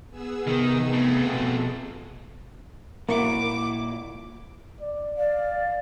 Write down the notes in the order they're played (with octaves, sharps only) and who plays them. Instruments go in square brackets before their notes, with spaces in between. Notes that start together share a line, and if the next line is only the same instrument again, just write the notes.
[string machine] B3 G#4 E6
[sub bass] C3 [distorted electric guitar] D#3
[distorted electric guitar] F2 A3
[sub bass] B2
[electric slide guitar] A#2 E4 F#4 [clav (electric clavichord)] A#3 [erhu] D6
[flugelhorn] D5
[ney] D5 [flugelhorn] F5